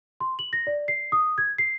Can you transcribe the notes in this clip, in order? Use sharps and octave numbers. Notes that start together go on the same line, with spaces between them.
C6
F#7
A#6
D5
C7
D#6
G#6
C7